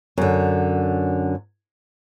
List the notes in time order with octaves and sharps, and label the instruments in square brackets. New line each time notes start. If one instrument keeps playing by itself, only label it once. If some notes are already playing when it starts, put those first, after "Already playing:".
[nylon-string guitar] F#2 D3